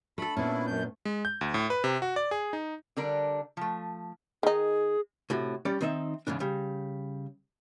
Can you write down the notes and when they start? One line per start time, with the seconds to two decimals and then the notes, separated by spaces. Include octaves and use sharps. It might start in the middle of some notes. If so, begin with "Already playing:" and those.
0.18 A3 D4 A4 B5
0.37 A#2 B3 C#4 D4 E4
0.67 F#2 G6
1.05 G#3
1.25 G6
1.41 D2
1.54 A2
1.70 B4
1.84 C3
2.02 F#4
2.16 D5
2.31 G#4
2.53 D#4
2.97 D3 G3 D4 A#4
3.57 F3 A3
4.43 D#3 D#4 G#4
5.30 A2 C3 F#4
5.65 G3 C#4 D5
5.81 D#3 C4 D#4 D#5 E5
6.27 E2 G#2 C#3 D4
6.40 C#3 G3